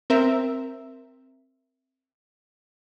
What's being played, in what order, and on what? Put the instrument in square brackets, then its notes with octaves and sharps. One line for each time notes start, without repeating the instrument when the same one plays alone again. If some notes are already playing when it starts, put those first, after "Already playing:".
[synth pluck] C4 A#4 E5